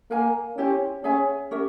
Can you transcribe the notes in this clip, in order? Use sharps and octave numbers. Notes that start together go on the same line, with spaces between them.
A#3 A#4 F5 G#5
C#4 E4 G4 C5
C#4 G#4 E5 G#5
C#4 G4 A#4 E5